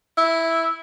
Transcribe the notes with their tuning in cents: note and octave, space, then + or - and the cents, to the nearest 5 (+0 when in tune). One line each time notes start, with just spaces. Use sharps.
E4 -5